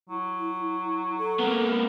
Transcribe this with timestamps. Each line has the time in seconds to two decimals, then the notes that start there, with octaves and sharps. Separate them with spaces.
0.09 F#3 E4
1.18 A4
1.39 A#3 B3